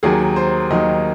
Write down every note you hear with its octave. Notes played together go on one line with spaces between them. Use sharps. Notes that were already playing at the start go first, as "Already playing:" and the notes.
D#2 D#3 F#3 G#4
C5
D#2 D#3 F#3 D#5